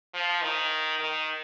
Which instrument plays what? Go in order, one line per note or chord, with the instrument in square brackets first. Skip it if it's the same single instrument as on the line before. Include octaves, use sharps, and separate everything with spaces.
[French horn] F3
D#3
D#3